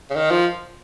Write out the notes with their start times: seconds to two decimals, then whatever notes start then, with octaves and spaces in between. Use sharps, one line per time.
0.10 C#3
0.16 D#3
0.31 F3